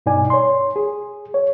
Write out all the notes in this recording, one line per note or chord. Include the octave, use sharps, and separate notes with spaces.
G2 B2 D#4 D5 G#5
C#5 C6
G#4
C#5